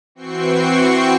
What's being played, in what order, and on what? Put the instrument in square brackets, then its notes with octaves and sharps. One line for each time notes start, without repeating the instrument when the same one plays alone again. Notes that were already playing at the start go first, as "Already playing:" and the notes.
[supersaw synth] E3 C4 F#4 G5 C#6 C7